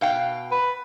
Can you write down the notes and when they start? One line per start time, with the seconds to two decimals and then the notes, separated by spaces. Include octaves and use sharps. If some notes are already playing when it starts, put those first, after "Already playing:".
0.01 B2 F5 G5
0.51 B4